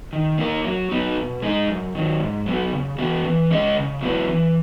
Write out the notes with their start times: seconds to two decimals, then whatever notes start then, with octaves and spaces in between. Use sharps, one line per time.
0.13 D#3
0.38 A#3 D#4 A#4
0.65 F#3
0.91 B3 D#4 F#4
1.17 B2
1.42 G#3 D#4 G#4
1.68 F#2
1.94 D#3 F#3
2.20 G#2
2.46 F#3 B3 F#4
2.73 C#3
2.98 E3 B3 F#4
3.24 E3
3.50 G#3 C#4 G#4 D#5
3.76 C#3
4.01 F#3 B3 E4 B4
4.28 E3